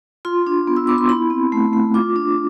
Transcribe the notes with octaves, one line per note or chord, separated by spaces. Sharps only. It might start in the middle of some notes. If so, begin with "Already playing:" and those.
F4 C6
D4
B3
E6
B3 D6
C6
E4 B5
C4
A3
A3
F4 D6
D4